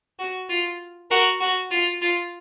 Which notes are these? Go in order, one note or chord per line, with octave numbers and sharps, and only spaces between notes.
F#4
F4
F#4 A#4
F#4
F4
F4